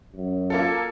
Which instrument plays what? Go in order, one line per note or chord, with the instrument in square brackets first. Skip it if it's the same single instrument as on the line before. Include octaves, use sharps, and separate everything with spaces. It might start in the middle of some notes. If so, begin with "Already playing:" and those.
[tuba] F#2
[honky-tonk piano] A#3 F4 A4